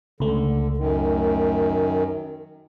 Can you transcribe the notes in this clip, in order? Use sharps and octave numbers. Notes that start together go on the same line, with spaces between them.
C#2 D3 A3
F#2 D#3